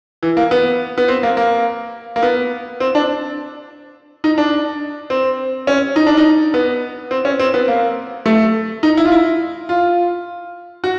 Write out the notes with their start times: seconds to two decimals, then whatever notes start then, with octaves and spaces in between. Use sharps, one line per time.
0.23 E3
0.37 A#3
0.51 B3
0.98 B3
1.08 C4
1.23 A#3
1.37 A#3
2.16 A#3
2.23 B3
2.80 C4
2.95 D4
4.24 D#4
4.38 D4
5.10 C4
5.67 C#4
5.96 D#4
6.07 D4
6.17 D#4
6.54 B3
7.11 C4
7.25 C#4
7.39 C4
7.54 B3
7.68 A#3
8.26 A3
8.83 D#4
8.97 E4
9.05 F4
9.12 E4
9.69 F4
10.84 F#4